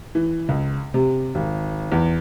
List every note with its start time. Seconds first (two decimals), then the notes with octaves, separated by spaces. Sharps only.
0.15 E3
0.49 C#2
0.94 C3
1.35 G#1
1.92 E2